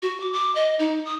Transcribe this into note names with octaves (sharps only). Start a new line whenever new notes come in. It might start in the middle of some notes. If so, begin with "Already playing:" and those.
F#4
D6
D6
D#5
D#4
D#6